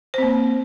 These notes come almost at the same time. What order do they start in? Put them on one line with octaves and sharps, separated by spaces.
C5 C4 A#3